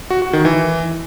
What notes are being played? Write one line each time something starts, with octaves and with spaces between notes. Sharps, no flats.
F#4
F#4
D#3
E3